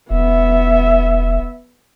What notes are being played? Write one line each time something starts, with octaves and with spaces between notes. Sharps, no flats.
E1 B3 E5